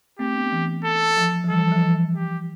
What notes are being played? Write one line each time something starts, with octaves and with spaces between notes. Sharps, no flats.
A3 C4 G4
B3 D4
E3
A4
F3
F3
E3 G3 A4
E3
F3
E3
G4